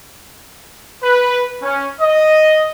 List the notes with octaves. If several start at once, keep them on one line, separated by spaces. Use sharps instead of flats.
B4
C#4
D#5